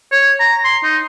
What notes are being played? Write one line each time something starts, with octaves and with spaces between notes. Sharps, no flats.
C#5
A#5
C6
D#4